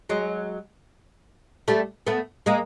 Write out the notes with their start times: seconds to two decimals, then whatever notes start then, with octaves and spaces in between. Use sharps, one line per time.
0.09 F#3 G#3
1.68 G3 A3
2.07 A3 B3
2.46 G#3 A#3